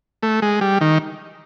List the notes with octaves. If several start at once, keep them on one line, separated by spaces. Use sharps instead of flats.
A3
G#3
G3
D#3